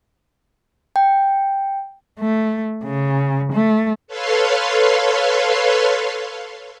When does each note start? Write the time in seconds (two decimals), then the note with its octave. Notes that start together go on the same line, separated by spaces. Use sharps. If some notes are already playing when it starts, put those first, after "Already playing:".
0.96 G5
2.20 A3
2.84 C#3
3.53 A3
4.07 A4 B4 C#5 F5 C6